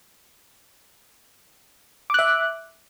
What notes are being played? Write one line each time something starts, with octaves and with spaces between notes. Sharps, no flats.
E5 D6 F#6